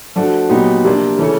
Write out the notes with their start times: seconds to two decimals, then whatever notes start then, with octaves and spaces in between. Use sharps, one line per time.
0.16 F3 A3 D4 F#4
0.49 A#2 F#3 B3 D#4 G4
0.84 C3 F3 A#3 D4
1.18 C#3 E3 A3 C#4